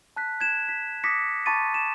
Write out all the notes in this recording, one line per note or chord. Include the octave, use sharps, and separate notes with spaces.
A5 F#6 B6
G#6 E7
B6
D6 D#6 A#6 B6 C#7
A5 B5 C#6 D6 A6 D#7
E7